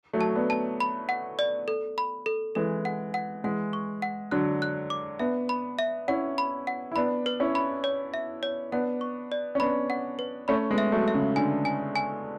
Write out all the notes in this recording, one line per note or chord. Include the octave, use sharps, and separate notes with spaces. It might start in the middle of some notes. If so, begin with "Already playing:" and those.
F#3 A3
A5
B3 D4
A5
B5
F#5
D5
A4
B5
A4
E3 G#3 A4
F#5
F#5
E3 G#3 F#5
C#6
F#5
D3 F#3 F#6
F#6
D6
B3 D4 E5
B5
E5
C#4 E4 F#5
B5
F#5
E4
B3 D4 B5
B4
C#4 E4
B5
C#5
E5
C#5
B3 D4 F#5
C#6
D5
C#4
B3 D4 B5
F#5
B4
A3 C#4 B5
G#3 B3
E5
F#3 A3
E5
C#3
D3 G#5
G#5
G#5